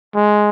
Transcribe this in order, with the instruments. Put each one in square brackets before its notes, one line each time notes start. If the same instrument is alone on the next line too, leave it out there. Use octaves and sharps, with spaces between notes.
[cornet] G#3